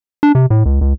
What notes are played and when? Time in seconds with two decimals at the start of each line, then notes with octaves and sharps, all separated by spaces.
0.23 D4
0.35 C3
0.50 A2
0.66 C#2
0.81 C#2